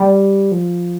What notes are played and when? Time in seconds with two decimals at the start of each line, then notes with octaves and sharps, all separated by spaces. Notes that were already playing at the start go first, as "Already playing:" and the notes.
Already playing: G3
0.52 F3